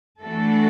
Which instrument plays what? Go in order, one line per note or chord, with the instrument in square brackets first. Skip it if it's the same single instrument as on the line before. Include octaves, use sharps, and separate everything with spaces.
[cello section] E3 A3 D4 F#4 A4